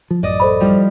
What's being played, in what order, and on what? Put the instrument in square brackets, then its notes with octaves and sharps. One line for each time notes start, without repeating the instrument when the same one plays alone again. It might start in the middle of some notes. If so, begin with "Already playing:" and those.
[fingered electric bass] F3
[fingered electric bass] A1 F#2 [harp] D5 D#5
[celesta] A4 C5 B5
[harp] F3 G3 E4